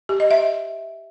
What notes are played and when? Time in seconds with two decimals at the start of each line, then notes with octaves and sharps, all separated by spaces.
0.09 G4
0.20 D#5
0.31 E5